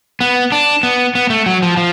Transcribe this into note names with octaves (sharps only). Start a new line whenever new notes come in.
B3
D4
B3
B3
A3
F#3
F3
F3